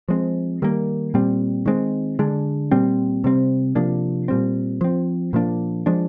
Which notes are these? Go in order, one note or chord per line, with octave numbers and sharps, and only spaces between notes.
F3 G#3 C4
D#3 G3 A#3
A#2 G3 C4
D#3 G#3 C4
D3 G#3 D4
A#2 G3 C4
C3 G3 C4
C3 F3 A#3 D4
A#2 G3 C4
F3 C4
A#2 F3 A#3 D4
F3 G#3 D4